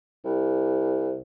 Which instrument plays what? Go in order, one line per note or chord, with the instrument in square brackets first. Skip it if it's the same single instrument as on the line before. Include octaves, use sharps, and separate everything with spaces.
[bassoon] C2